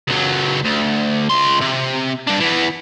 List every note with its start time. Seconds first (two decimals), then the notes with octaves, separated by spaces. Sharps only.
0.08 C#2 F#3
0.65 D2
1.29 C#2 C6
1.61 C3
2.27 G2 D4
2.40 E3 B3